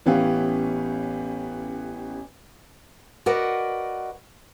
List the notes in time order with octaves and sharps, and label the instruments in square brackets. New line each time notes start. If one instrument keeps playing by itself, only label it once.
[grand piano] A1 E3 B3 C#4 G4 F5
[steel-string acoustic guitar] F#4 A#4 B4 D5 D#5 F#5